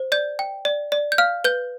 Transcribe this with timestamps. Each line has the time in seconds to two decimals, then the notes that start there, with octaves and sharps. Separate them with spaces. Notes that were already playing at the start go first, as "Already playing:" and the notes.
Already playing: C5
0.12 D5 G6
0.39 G5
0.65 D5
0.92 D5
1.12 G6
1.18 F5 F6
1.44 B4 G6